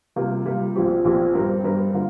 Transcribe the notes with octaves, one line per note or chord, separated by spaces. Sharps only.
C3 G3 A#3 F4
C3 G3 A#3 F4
A#1 A#2 F3 C4 G4
A#1 A#2 F3 C4 G4
G2 G3 C4 A#4
G2 G3 C4 A#4
D3 A#3 F4